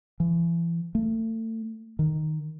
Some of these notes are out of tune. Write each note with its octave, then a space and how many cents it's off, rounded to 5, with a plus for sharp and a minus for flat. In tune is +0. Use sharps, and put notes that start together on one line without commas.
E3 +35
A3 +30
D#3 -5